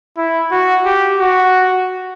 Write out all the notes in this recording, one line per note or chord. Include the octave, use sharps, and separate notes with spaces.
E4
F#4
G4
F#4